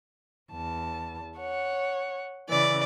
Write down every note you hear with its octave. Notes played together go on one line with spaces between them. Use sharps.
E2 A5
C#5 F#5
C#3 E3 D5